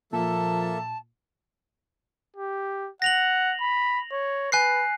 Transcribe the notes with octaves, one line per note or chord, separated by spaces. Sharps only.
A#2 F3 A#3 A4 E5 A5
G4
F#5 A#6 F7 F#7
B5
C#5
B4 G#5 F#6 C7